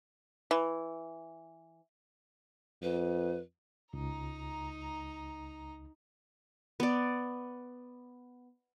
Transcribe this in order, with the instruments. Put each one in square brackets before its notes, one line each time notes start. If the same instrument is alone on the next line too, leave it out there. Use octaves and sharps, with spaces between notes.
[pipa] E3
[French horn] F2 [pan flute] B4
[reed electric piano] C#2 [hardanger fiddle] D#4 A#5
[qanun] B3 D5